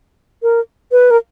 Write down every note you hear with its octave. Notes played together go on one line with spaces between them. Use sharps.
A#4
B4
A#4